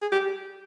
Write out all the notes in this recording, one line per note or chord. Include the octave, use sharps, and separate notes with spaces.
G#4
G4